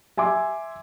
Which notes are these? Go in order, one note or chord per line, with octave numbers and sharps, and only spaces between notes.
E5 G#5 C6 D6